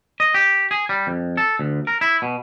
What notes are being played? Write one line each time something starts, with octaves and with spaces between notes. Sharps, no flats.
D#5
G4
G#4
G3
F2
A4
D2
A#4
E4
B2